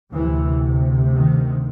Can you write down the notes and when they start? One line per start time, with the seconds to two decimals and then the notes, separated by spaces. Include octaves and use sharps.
0.13 D2 C3 E3
1.15 D#3